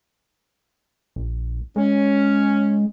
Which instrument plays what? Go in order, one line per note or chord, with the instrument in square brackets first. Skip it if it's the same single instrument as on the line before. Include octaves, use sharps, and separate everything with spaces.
[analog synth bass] A#1
[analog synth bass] G#3 [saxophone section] C#4